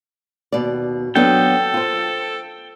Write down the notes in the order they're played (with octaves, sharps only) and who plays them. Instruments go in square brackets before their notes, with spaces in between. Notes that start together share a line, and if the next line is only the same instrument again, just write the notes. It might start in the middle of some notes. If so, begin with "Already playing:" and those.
[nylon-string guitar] D#2 B2 D5
[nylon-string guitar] F#3 B3 D4 [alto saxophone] A4 [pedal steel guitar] G5
[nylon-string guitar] F4 C5